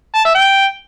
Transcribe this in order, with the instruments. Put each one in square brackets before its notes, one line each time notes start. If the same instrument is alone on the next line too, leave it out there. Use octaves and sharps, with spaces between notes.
[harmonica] A5
E5
G5